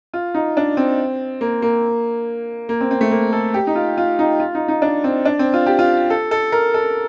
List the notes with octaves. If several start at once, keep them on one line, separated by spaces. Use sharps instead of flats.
F4
D#4
D4
C4
A#3
A#3
A#3
C4
C4
A3
A#3
A4
G4
D#4
F4
F4
D#4
F4
D#4
D#4
D4
C4
D4
C4
F4
G4
F4
A4
A4
A#4
A4